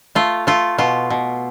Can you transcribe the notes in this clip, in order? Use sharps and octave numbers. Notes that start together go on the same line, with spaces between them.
A3 F4
A3 F4
B2 F4
B2